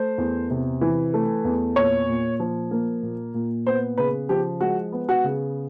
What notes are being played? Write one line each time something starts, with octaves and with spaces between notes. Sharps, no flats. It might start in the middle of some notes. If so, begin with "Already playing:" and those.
Already playing: A3 C5
E2
C3
E3
A3
E2
A#2 C#5
A#2
F3
A#3
A#2
A#2
B3 C5
C#3 B4
F3 G4
G#3 F#4
B3
F#4
C#3